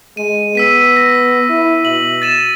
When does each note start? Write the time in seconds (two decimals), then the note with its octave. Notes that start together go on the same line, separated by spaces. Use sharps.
0.17 G#3 D#7
0.55 B3 E6 B6 D#7
0.96 A#6
1.49 E4
1.85 B2 F#7
2.22 A6 D#7 E7